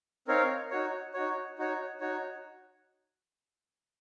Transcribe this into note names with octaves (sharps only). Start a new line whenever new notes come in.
C4 D#4 A#4 C#5 F5
D#4 F#4 C#5
D#4 F#4 C#5
D#4 F#4 C#5
D#4 F#4 C#5